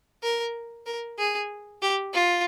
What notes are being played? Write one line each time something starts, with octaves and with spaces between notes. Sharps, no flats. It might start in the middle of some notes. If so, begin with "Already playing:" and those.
A#4
A#4
G#4
G4
F4